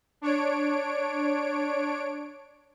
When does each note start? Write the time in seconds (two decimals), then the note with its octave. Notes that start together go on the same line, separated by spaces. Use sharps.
0.21 D4 C#5 D7